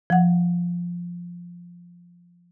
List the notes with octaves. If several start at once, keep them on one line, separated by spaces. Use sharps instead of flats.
F3 F#5